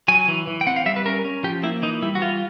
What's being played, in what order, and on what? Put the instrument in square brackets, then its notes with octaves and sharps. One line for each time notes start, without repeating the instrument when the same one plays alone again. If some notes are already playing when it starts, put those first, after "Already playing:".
[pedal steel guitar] F#3 G#5
E3
E3
G5
C4 F#5
F5
G3 E5
B4
C#4 A#4
C#4
F3 G4
A#3 E4
E3 D#4
G3 E4
F#4
E3 F4